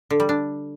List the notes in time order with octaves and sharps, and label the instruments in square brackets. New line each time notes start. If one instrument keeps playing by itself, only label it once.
[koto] D3
G3
D4